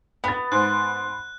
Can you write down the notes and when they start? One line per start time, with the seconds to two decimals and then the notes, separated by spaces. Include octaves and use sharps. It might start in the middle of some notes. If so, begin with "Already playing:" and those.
0.24 B3 B5 A6
0.52 G#2 F#6